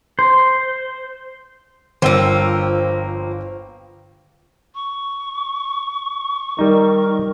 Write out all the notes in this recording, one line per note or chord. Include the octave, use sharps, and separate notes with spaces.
C5
G1 F3 A#3 G5 E6
C#6
D#3 G3 D#4 A#4